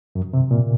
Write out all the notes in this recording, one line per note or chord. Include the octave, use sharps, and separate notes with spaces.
F#2
C3
A#2